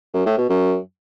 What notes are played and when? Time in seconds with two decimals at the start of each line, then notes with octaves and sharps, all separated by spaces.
0.14 F#2
0.26 A2
0.38 B2
0.50 F#2